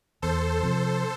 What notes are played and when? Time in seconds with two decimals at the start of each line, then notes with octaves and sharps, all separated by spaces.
0.22 E2 A4 C5
0.63 C3 F3